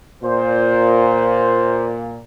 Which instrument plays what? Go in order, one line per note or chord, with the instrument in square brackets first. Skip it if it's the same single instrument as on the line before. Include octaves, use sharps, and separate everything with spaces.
[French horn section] A#2 [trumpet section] C5